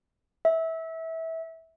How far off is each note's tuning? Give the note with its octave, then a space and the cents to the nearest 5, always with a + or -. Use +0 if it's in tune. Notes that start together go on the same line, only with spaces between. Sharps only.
E5 -20